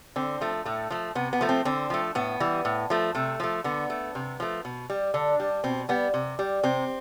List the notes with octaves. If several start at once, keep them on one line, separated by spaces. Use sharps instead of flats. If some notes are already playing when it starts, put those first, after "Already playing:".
D3 C4
F3 A3
A2 A3
F3 A3
C3 B3
B3
F3 A3
C4
D3 C4
F3 A3
A2 B3
E3 G3
A2
F3 A3
C3 A3
F3 A3
D3 B3
A3
C3
F3 A3
B2
G3
D3 D4
G3
B2 C4
G3 B3
C3
G3
C3 C4